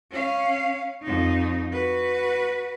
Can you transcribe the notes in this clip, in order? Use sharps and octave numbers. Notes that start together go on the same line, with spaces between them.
C#4 F5
F2 D#4
F#4 B4